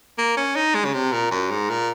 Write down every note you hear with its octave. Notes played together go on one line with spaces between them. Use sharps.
A#3
C#4
D#4
G#3
C#3
C3
A#2
F#2
G#2
A#2